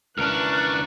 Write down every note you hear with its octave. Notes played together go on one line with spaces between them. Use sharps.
C#2 E3 D4 A#4 C#6 F6 F#6 D7